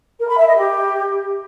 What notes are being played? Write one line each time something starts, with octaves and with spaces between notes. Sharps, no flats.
A#4
B5
E5
D#5
G4